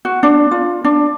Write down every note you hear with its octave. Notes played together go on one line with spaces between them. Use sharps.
F#4
D4
F4
D4